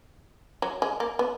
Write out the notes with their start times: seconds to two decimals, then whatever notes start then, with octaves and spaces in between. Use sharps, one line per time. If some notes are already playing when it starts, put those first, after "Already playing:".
0.62 F#3
0.82 G#3
1.00 A#3
1.19 B3